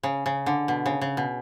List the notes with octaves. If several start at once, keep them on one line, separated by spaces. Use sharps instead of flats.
C#3
C#3
D3
B2
C#3
C#3
B2